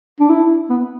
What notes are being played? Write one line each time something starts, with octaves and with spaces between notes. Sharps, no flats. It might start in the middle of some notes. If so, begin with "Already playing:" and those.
D4
E4
B3